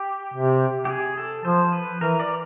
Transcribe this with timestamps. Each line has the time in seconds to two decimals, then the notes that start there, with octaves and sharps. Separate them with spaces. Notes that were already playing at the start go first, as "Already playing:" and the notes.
Already playing: G4
0.34 C3
0.85 G4
0.89 G#4
1.18 A4
1.45 F3 C5
1.72 B4
2.00 E3 A#4
2.20 D5